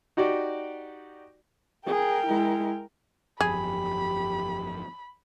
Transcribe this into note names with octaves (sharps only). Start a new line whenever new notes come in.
D#4 F#4 G4 D5
G#4 A#4 G5
G#3 E4
G1 F2 G4 G#4 B5